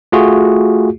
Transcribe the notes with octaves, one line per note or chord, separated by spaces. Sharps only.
A3 F4 F#4 G#4